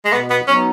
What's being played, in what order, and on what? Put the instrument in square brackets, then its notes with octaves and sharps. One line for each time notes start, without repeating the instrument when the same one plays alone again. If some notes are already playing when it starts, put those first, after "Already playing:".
[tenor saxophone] G#3
[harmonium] B2 [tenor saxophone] B3
[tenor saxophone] B3
[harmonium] F#3 B3 D#4 [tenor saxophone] C#4